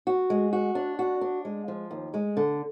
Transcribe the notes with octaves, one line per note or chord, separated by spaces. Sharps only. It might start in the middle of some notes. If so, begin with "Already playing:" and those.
F#4
G#3
F#4
D4
F#4
D4
G#3
F3
D#2
G#3
D3